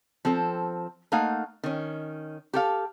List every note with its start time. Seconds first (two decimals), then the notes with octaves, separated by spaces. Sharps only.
0.25 F3 C4 A4
1.12 A3 A#3 D#4 F5 F#5
1.63 D#3 C#4
2.53 G4 A4 F5